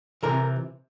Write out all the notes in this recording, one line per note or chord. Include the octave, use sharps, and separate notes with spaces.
C3 E3 A#4